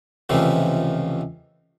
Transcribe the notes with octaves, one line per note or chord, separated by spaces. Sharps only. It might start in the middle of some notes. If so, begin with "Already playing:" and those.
C#2 C3 E3 F3 A3